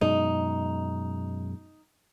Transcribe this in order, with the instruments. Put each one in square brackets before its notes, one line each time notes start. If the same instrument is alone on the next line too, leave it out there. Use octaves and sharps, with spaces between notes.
[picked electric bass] F#2 B2 G#3 [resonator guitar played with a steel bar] D#4